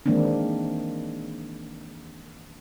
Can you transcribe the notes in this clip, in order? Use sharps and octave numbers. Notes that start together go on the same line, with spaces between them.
D#3 E3 G#3 A#3 C4 D4